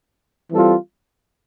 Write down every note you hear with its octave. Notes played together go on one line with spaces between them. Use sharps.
E3 G3 C4 F4 A4